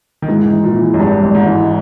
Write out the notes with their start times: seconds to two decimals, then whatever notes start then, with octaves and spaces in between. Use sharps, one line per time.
0.22 D#3
0.28 G#2 E3
0.46 D#3
0.53 E3
0.64 A#2
0.76 E3
0.94 F#2
0.99 G#1 G2
1.23 G#1
1.35 G#2
1.46 E3